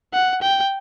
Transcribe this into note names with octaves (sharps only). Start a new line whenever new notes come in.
F#5
G5